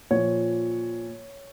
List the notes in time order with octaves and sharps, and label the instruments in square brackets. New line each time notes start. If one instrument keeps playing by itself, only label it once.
[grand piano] A#2 F3 C#5